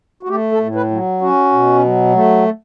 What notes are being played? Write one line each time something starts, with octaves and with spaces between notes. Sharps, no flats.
F#4
A3 G4
A4
A2
B4
F#3
C#4 F#4
B2
F#3
A3